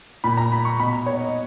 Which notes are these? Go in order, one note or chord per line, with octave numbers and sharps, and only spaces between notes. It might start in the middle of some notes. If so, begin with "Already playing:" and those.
A#2 B5
A#5
B5
C#6
B2 B5
A#5
C#5
D#5